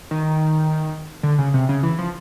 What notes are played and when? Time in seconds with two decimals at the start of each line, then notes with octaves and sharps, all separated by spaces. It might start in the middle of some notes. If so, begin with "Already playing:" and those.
0.11 D#3
1.23 D3
1.38 C#3
1.54 C3
1.69 C#3
1.83 E3
1.99 F3